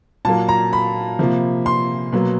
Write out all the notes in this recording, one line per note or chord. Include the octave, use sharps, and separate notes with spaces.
A#2 F#3 A#3 A5
A#5
B5
C3 F3 A#3
C6
B2 F#3 A#3